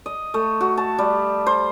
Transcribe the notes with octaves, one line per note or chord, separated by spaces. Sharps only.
D#5
A3
F#4
A5
G3
C5